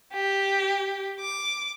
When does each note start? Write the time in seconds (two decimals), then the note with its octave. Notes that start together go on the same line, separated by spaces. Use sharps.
0.13 G4
1.20 D6